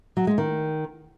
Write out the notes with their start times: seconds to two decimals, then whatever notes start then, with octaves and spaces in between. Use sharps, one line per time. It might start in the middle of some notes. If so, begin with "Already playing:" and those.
0.17 F#3
0.27 G#3
0.38 D#3